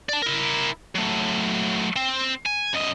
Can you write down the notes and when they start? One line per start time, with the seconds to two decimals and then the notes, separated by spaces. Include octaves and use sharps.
0.09 D5 A5
0.22 E4 A#4
0.95 F#3 A3
1.96 C4
2.46 G#5
2.74 F#2 D#5